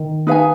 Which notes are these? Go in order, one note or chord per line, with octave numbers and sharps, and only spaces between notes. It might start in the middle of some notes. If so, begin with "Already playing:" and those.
Already playing: D#3
D#4 B4 F5 G#5